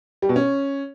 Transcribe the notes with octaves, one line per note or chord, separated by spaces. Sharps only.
G3
B2
C#4